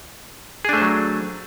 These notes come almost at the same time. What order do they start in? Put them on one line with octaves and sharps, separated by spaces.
G#4 D4 A3 C5 F#3